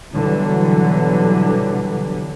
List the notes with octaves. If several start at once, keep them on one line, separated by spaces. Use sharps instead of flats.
B2 D3 E3 F#3 G3